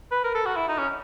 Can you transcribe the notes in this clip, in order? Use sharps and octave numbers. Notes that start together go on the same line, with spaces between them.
B4
A#4
A4
F#4
E4
D#4
C#4